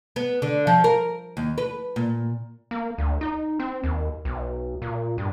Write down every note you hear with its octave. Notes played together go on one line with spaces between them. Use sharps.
B3
D3
F3
A#4
D#2
B4
A#2
A#3
D2
D#4
C4
D#2
B1
A#2
G2